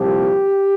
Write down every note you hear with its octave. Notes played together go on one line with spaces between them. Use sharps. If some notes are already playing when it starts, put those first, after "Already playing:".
Already playing: C2 A#2 F3 G4